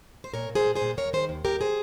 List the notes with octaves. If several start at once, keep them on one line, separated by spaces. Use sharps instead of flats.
C5
A#2 A#4 C#5
A#2
G#4 C5
A#2
G#4 C5
A#2
D#2 A#4 C#5
D#3 G#4 C5
D#2
D#2 G4 A#4
G#4 C5